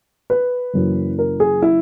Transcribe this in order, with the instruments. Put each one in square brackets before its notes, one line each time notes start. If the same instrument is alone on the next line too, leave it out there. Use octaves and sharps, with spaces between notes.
[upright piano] B4
F#1 F#2 E3
A#4
G#4
E4